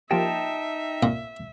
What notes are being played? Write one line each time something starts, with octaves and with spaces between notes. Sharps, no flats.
F3 A#3 D#4 G4 E5 G5 A5
A#2